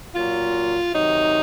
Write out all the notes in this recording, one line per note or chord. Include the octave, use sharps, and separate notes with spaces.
A#2 F#3 F4
C3 D#3 F#3 D#4